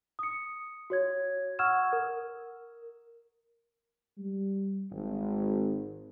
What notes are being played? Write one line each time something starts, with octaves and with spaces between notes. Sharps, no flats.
D#6 C#7
F#4 C#5 G#6
F#5 C#6 E6 F6 G#6 E7
A#4
G3
G#1